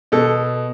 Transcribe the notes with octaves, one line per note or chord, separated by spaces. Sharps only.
B2 A4